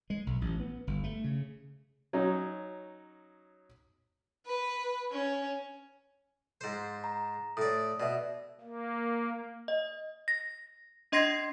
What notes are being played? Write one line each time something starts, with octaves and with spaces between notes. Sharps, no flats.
G#3
B1
A1
B3
G1
A3
C#3
F#3 C#4 D#4
B4
C#4
G#2 C5
A#5
A2 D5 D#6
B2 D5 E5
A#3
D#5
A#6
D4 D#5 C6 G#6 A#6 C7